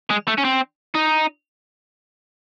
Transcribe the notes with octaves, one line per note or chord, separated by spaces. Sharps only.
G#3
A3
C#4
C4
D#4